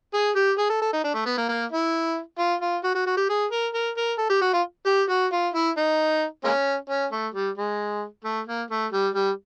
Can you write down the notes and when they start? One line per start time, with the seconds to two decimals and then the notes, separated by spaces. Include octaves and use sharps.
0.14 G#4
0.36 G4
0.58 G#4
0.70 A4
0.81 A4
0.93 D#4
1.04 D4
1.15 A3
1.26 B3
1.38 A#3
1.49 A#3
1.72 E4
2.38 F4
2.62 F4
2.84 F#4
2.95 F#4
3.07 F#4
3.17 G4
3.29 G#4
3.51 A#4
3.74 A#4
3.97 A#4
4.18 A4
4.30 G4
4.42 F#4
4.53 F4
4.86 G4
5.10 F#4
5.32 F4
5.54 E4
5.77 D#4
6.44 G#3 A#3 C#4
6.90 C#4
7.12 A3
7.34 G3
7.57 G#3
8.25 A3
8.47 A#3
8.70 A3
8.92 G3
9.14 G3